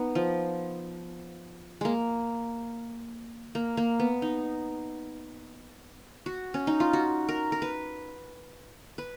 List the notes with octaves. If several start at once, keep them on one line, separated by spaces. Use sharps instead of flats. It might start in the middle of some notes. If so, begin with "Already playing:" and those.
Already playing: B3 D#4
F3
G#3 A#3
A#3
A#3
B3
D#4
F#4
C#4
D#4
F4
F#4
A#4
A#4
B4
B4